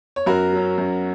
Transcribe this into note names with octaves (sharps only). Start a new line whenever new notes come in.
C#5
F#2 F#4 A#4
F#3 C#4
F#2